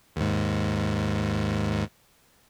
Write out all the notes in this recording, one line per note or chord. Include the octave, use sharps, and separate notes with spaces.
D#2 G#2